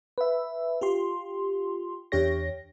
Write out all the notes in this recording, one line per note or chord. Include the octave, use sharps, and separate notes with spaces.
B4 E5
F4 G4 C6
E2 D4 G4 C#5 A#6